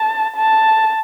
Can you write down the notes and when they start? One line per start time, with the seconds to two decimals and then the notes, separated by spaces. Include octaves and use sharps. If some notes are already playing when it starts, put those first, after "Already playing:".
Already playing: A5
0.36 A5